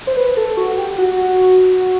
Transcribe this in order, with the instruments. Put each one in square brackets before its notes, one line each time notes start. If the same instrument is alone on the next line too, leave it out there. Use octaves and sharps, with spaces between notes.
[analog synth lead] C5
B4
A4
F#4
G4
F#4